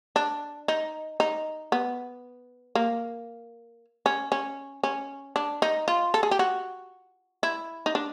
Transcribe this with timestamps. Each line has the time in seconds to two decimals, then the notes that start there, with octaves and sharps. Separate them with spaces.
0.16 D4
0.68 D#4
1.20 D#4
1.72 B3
2.75 A#3
4.06 C#4
4.32 C#4
4.84 C#4
5.36 D4
5.62 D#4
5.88 F4
6.14 A4
6.23 G#4
6.31 G4
6.39 F#4
7.43 E4
7.86 D#4
7.95 D4